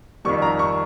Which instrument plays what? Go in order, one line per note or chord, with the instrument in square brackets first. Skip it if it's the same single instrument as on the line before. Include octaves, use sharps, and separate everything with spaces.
[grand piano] F2 D#3 G3 C#6
A#5
C#6